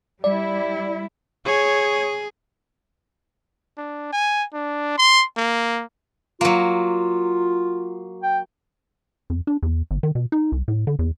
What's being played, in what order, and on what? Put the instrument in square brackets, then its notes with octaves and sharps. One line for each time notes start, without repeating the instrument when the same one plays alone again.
[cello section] G3 E4 [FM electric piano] D5
[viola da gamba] G#4 [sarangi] C#5
[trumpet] D4
G#5
D4
C6
A#3
[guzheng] F#3 A#3 [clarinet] F4
[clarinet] G5
[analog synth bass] F2
D4
E2
G1
D#3
B2
D#4
C2
A2
D3
E2